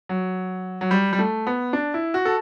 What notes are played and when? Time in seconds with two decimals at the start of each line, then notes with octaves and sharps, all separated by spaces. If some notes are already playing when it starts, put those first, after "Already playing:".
0.09 F#3
0.81 F#3
0.91 G3
1.13 G3
1.19 A3
1.47 B3
1.73 D4
1.94 E4
2.14 F#4
2.25 A4